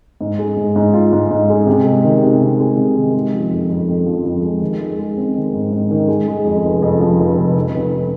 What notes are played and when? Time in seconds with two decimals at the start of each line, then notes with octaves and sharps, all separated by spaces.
0.21 G#2
0.39 G#3
0.57 G#2
0.76 G#2
0.94 F4
1.13 G#2
1.31 G#2
1.50 G#3
1.67 C3
1.85 G#3
2.04 D#3
2.23 C3
2.41 C3
2.60 G#3
2.77 C3
2.96 D#3
3.14 G#3
3.33 F3
3.51 F2
3.70 F2
3.88 F2
4.06 F3
4.25 F2
4.43 G#3
4.62 D#3
4.80 G#3
4.99 G#3
5.17 C4
5.36 D#3
5.54 G#2
5.72 G#2
5.91 D#3
6.08 G#3
6.28 G#3
6.45 F2
6.64 F1
6.82 F2
7.00 F3
7.19 F1
7.38 F1
7.56 F1
7.74 F1